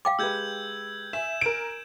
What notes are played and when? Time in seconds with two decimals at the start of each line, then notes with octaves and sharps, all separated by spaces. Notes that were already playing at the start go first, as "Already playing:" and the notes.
0.05 F5 G5 D6
0.19 G#3 G4 B4 E6 G6 G#6
1.13 E5 G#5 E7
1.41 A#4 D7